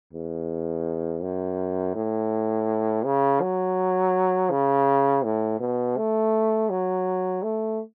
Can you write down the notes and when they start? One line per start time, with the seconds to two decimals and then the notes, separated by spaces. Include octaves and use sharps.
0.13 E2
1.22 F#2
1.95 A2
3.05 C#3
3.41 F#3
4.50 C#3
5.24 A2
5.60 B2
5.97 A3
6.70 F#3
7.43 A3